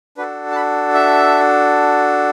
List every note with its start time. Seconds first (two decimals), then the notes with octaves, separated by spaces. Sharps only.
0.17 D4 F#4 A4 B4
0.51 A5
0.56 B5
0.94 E5